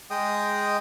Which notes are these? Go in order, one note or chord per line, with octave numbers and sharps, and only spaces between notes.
G#3 G#4 D#5 G5 D#6